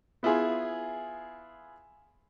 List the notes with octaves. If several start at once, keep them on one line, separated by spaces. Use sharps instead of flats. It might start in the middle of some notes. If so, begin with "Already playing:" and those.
B3 E4 F4 G#4